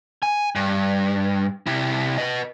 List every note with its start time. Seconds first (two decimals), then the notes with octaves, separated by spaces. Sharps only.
0.23 G#5
0.55 G2
1.67 C3 E4
2.18 B4 D#5